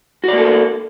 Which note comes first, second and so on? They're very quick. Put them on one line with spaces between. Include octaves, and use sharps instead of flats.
F#4 D5 A#3 A4